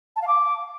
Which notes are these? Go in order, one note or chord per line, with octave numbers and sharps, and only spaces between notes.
A5
F5
D6